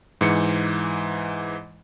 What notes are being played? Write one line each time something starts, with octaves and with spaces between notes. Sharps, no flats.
G#2 E3 C#7